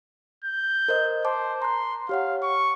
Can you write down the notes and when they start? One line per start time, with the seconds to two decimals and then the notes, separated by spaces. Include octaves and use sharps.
0.44 G6
0.88 A#4 C5 D#5
1.25 C5 A5 D6
1.62 A#5 C6 F#6
2.09 G4 C#5 F5 F#5
2.43 C#6